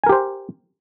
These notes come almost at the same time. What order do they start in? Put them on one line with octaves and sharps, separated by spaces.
G#5 A#4 G4 C5